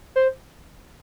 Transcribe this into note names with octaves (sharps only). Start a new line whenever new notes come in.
C5